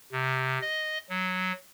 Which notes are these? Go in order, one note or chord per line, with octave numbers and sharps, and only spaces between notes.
C3
D#5
F#3